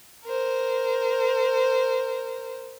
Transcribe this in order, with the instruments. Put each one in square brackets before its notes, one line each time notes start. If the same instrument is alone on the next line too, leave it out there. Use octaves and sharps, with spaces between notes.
[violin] A#4 C5